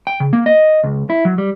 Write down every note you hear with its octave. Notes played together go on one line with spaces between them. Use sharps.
G5
C#3
A#3
D#5
C#2
E4
F#3
G3